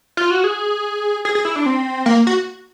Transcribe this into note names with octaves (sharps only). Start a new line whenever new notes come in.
F4
F#4
G#4
G#4
G#4
E4
D4
C4
A#3
F#4